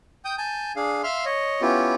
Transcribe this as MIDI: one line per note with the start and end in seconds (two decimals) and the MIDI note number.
0.25 0.36 79
0.25 0.36 87
0.25 0.36 91
0.38 0.72 80
0.38 0.72 81
0.38 0.72 91
0.76 1.02 62
0.76 1.02 68
0.76 1.02 77
1.04 1.25 76
1.04 1.25 77
1.04 1.25 84
1.04 1.25 89
1.25 1.61 73
1.25 1.61 75
1.61 1.95 59
1.61 1.95 61
1.61 1.95 64
1.61 1.95 65
1.61 1.95 67